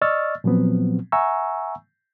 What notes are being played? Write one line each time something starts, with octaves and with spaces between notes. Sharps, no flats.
D5 D#5 C#6 E6 F6 A6
A#2 F3 F#3 B3 C4
E5 F#5 G#5 A#5 C#6 E6